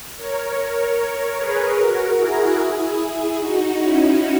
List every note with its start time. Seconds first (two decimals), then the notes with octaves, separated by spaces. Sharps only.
0.17 A#4 C#5
1.37 G#4 B4
1.77 F#4 A#4
2.17 E4 G#4
3.38 D#4 F#4
3.78 C#4 E4